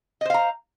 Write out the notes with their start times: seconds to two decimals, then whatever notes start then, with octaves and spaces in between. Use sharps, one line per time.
0.21 D#5
0.25 C5
0.30 F5
0.34 A#5